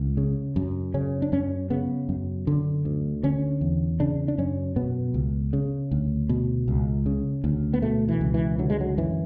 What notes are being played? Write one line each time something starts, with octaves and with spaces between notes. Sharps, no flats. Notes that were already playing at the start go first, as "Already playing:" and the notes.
Already playing: C#2
C#3
F#2
C#3 C#4
D4
F#2 C#4
C#3 B3
F#2
D3
D2
D3 C#4
E2
C#3 D4
D4
F#2 C#4
B2 B3
C#2
C#3
D2
B2
C#2
C#3
D2
B3
B2 A3
E3
C#2
E3
D3 F#3
G#3
F#3
F#2 E3